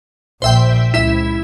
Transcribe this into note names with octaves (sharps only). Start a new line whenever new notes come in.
A#1 C5 E5 G5
C#2 E4 E5